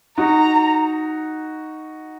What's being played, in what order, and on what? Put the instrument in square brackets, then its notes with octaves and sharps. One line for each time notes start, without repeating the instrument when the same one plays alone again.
[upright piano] D#4 F#4 [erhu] A#5